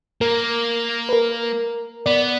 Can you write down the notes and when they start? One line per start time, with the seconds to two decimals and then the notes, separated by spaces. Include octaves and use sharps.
0.21 A#3 A#4
1.09 B4
1.13 A#4
2.06 B3 D5